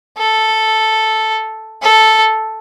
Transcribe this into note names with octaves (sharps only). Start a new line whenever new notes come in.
A4
A4